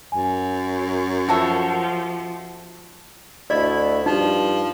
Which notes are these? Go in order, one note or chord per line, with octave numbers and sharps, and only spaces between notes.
F#2 G#5
F3 F#4 A4 E5
D2 E4 D5 D#5
G2 F3 D#4